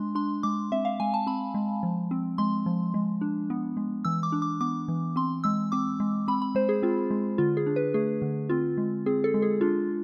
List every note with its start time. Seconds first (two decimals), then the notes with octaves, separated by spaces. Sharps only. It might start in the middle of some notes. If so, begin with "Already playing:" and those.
Already playing: G#3 D4 C6
0.15 D4 C6
0.43 G#3 D6
0.72 C4 E5
0.85 F5
1.00 G#3 G#5
1.14 A5
1.27 C4 B5
1.54 G#3
1.83 F3
2.11 C4
2.38 G#3 C6
2.66 F3
2.94 G#3
3.21 D4
3.50 B3
3.77 G#3
4.05 E3 E6
4.23 D6
4.32 D4
4.42 D6
4.61 B3 D6
4.88 E3
5.16 C4 C6
5.44 G#3 E6
5.72 C4 D6
6.00 G#3
6.28 C4 B5
6.42 B5
6.55 G#3 C5
6.69 G#4
6.83 C4 F4
7.11 G#3
7.38 D3 F4
7.57 G#4
7.66 D4
7.76 B4
7.94 A3 G#4
8.22 D3
8.50 C4 F4
8.78 G#3
9.06 C4 G#4
9.24 A4
9.34 G#3
9.42 G#4
9.61 D4 F4